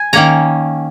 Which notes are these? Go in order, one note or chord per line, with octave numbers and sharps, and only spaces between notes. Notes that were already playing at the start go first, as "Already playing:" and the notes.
Already playing: G#5
D#3 A#3 C#4 A#5